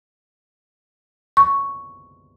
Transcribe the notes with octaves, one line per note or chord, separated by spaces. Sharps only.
C#6